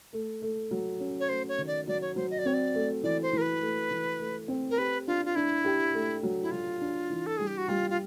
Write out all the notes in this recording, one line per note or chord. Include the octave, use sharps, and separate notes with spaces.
A3
A3
F#3
C#4
C#5
A3 C5
C#5
D#3
D5
F#3 D5
C#5
F#3 C5
D#5
D5
C4 C#5
D5
A3
E3 D5
C5
E3 A#4
B4
A3
E3
A3
C4
A#4
G4 B4
D4 F4
F4
D4 E4
G4
A3
F#3
E4
F#3 F4
D4
E3
A4
G3 G#4
G4
F#4
G3 F4
F4